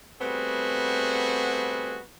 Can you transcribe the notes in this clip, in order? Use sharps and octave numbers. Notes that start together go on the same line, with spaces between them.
G3 A3 B3 C4 F#4 G#4